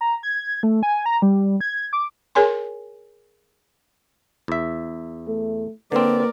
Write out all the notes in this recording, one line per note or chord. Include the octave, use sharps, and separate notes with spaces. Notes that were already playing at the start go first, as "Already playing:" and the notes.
A#5
G#6
A3
G#5
A#5
G3
G#6
D6
G#4 A#4 C#5 G#5 C6
E2 E5
A3
D3 A#3 C4 A#4 B4 D5